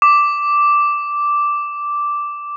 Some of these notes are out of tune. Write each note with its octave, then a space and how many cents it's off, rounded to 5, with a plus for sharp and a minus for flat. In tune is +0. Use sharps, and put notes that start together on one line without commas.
D6 -5